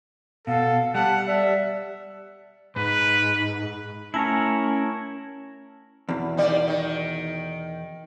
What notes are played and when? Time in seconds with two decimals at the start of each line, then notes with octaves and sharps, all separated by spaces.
0.47 B2 A4 F5
0.94 G3 F#5 A5
1.27 D5 E5
2.76 G#2 B4
4.14 A3 C#4 E4 A#4 C#5 G#5 A5
6.09 E2 B2
6.37 D#2 G3 D5
6.68 D#3